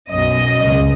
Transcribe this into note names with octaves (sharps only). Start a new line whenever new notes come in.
B1 F#2 D#5
C#2